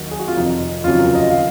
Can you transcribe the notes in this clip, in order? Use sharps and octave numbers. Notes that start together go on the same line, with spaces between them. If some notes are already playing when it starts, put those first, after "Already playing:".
Already playing: D#2 D#3 F#3 F#4
G#4
F#4
F4
F1 F2 D#3 D#4
F1 D#2 C#3 F#3 F4
A#4
D#5
D#3 F#3 F5